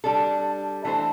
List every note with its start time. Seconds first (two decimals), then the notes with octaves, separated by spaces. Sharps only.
0.04 G3 D4 A4
0.85 E3 A3 D4 A4 C5